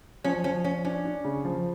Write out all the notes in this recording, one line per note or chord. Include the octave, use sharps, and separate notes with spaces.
F3 C#4
F3 C#4
F3 C#4
C#4 D4
D4
C#3
F3